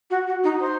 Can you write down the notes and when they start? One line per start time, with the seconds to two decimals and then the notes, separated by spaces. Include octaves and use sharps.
0.10 F#4
0.27 F#4
0.44 D#4
0.60 C5